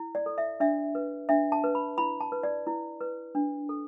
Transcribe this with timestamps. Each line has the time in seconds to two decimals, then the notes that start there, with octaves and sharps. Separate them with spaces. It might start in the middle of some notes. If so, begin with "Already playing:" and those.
Already playing: E4
0.15 D5
0.26 A4
0.38 E5
0.60 D4 E5
0.95 B4
1.29 D4 E5
1.52 A5
1.64 B4
1.75 B5
1.98 E4 B5
2.21 A5
2.32 B4
2.43 D5
2.67 E4
3.01 B4
3.35 D4
3.69 A4